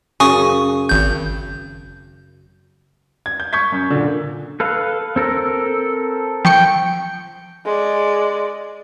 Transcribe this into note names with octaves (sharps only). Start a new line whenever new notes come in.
F#2 C#3 G#5 C#6 D#6
G#1 G6
G#6
G6
C#6 G6 G#6 B6
F#2
A#2 D3
A4 B4 F5
C4 A4 A#4
F3 G5 C#6 C#7
G#3 D5